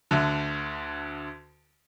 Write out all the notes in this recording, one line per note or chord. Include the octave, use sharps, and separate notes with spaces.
D2 D3